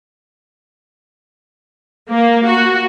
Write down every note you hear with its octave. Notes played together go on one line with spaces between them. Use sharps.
A#3
F#4